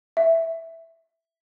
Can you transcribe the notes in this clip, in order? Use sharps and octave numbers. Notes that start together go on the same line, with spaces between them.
E5